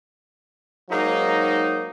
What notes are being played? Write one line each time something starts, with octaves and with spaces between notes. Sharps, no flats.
G#2 F#3 A#3 D#4